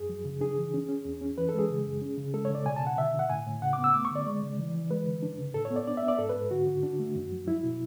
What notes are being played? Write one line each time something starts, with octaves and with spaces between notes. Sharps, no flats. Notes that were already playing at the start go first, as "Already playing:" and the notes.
Already playing: F#2 G#4
F#3
C#3
D4 G#4
E3
C#4
C#4
E2
C#4
E3 B4
A4
G#3 G#4
C#3
F#2
C#4
C#3
G#3 A4
C#5
C#3 D5
B2 G#5
A5
B2 F#5
D3 E5
D3 F#5
A2 G#5
A2
C#3 F#5
D6
B3
E6
A3 D6
C#6
D3 D5
G#3
C#3
E3
E3
G#3 B4
D3
D4
C#3
A2 A4
C#5
B3
D5
D4 D5
E5
B3
D5
G#2 A4
B4
G#2
D3 F#4
D3
D4
A3
F#2
F#3
F#3 E4
B2